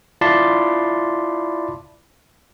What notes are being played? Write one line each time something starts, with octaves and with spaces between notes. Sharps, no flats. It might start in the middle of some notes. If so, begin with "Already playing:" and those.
E4 F4 D5 A5 B5 C6